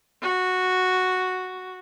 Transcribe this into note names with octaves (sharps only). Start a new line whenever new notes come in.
F#4